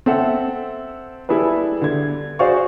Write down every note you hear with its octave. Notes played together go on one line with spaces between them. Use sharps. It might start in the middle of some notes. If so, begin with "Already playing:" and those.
C4 A4 E5 F#5
G3 E4 G#4 A4 B4
D3 G#6
F#4 G#4 C5 D5 F5 C#6